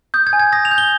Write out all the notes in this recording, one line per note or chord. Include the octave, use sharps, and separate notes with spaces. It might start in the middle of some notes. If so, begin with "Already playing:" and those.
D#6 G6
G#6
G#5
G#6
D#6 A#6
F7
G6
G7